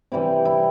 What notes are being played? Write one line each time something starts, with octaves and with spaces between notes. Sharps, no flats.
C3 E3 G3 E4
E4